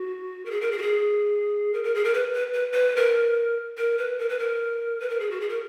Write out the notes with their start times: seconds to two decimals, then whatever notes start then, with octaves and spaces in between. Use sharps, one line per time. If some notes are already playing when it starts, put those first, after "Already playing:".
Already playing: F#4
0.45 A#4
0.51 G#4
0.61 A#4
0.71 G#4
0.78 F#4
0.82 G#4
1.73 A#4
1.84 A#4
1.95 G#4
2.04 A#4
2.14 B4
2.34 B4
2.53 B4
2.73 B4
2.96 A#4
3.77 A#4
3.98 B4
4.18 A#4
4.29 B4
4.39 A#4
5.00 B4
5.09 A#4
5.20 G#4
5.31 F#4
5.41 G#4
5.49 A#4